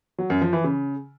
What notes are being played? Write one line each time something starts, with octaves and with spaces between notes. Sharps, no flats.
F#3
F#2
F3
E3
C#3